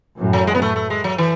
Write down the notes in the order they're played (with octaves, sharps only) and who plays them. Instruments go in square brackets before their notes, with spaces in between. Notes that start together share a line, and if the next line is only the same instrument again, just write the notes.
[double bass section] F#2 A2
[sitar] F#3
G#3
B3
A3
A3
G#3
F#3
E3